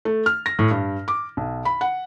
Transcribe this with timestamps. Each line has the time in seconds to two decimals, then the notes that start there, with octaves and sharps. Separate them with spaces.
0.05 A3
0.26 F6
0.46 A#6
0.59 A2
0.71 G2
1.08 D6
1.37 B1
1.65 B5
1.81 F#5